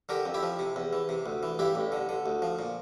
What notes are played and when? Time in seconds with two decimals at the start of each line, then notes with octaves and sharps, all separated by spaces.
0.09 D3 G4 A#4
0.26 F2
0.34 E4 G4
0.43 F3
0.59 C3
0.76 E2
0.93 E3
1.09 C3
1.26 D2
1.43 E3
1.59 G2 E4 G4
1.75 A1
1.92 D3
2.09 D3
2.26 D2
2.42 F3
2.59 A#2